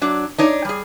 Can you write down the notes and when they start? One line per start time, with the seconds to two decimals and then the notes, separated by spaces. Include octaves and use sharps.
0.02 F#3 D4
0.38 D4 D#4 C#5
0.65 G3 G#4